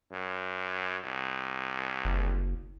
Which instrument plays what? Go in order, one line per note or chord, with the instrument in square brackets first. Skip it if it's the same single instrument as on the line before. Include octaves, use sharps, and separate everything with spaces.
[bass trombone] F#2
C2
[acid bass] F#1